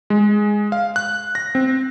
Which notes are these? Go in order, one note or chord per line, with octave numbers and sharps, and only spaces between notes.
G#3
F5
F#6
A#6
C4